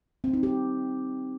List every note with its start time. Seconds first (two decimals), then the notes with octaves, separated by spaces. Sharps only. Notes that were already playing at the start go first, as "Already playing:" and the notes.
0.24 C4
0.33 D#4
0.43 G4